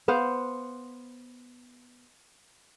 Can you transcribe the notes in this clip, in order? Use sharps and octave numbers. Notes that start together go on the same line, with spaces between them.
B3 C5 F5 F#5